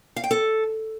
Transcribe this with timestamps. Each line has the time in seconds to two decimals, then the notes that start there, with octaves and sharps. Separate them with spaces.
0.16 F5
0.24 G5
0.31 A4